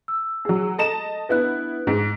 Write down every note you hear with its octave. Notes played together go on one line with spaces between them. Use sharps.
E6
F#3 G#4
A4 D#5 A5 A#5 E7
B3 D4 E4 B4 F#6
G#2